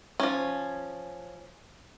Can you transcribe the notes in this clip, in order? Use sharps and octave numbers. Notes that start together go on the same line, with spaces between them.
F3 C#4